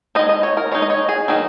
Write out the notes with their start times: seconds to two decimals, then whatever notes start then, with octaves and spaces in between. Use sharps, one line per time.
0.15 G#3 D#4 D#5
0.29 D#5
0.43 C#5
0.57 A#4
0.72 G#3 D#4 C#5
0.82 D#5
0.90 C#5
1.09 G#4
1.28 D#3 F#3 D#4